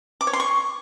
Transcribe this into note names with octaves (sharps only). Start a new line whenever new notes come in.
D6
C#5
C6
C#6